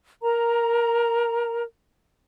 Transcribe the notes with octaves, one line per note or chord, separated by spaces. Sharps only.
A#4 A#5